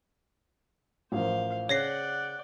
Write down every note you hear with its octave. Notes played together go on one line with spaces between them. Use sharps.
A1 F3 A#4 C5 F5
C#3 C#5 D5 F#5 G5 A#6 C7